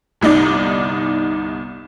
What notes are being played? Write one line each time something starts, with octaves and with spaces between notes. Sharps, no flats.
G1 C2 D#4 D5